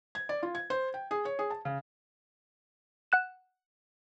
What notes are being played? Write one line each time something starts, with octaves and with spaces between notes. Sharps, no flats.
G#6
D5
F4
G#6
C5
G5
G#4
C#5
G#4
A5
C#3
F#5 F#6 E7